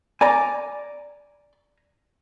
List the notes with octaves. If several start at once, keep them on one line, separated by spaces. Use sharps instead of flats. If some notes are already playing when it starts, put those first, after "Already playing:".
D5 G#5 A#5